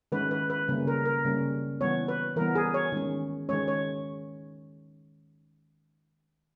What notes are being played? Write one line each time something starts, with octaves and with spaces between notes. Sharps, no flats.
D#3 G#3 C#4 B4
B4
B4
C#3 G3 A#3 C#4
A#4
A#4
C#3 G3 A#3 C#4
E3 G3 B3 C#5
B4
E3 G3 B3 A#4
G#4
C#5
D#3 G#3 C#4
D#3 G#3 C#4 C#5
C#5